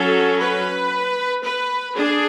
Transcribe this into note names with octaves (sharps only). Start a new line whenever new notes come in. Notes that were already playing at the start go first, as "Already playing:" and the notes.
Already playing: F#3 C#4 A4
B4
B4
D4 G#4